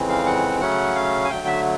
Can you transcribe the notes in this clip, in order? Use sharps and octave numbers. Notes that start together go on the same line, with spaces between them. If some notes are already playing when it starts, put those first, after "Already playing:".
Already playing: F2 C#3 E3 G#3 C4
F5
F#5
C#3 F#3 A3 C#4 F#5
F5
G#5
D3 F#3 A3 G5
E5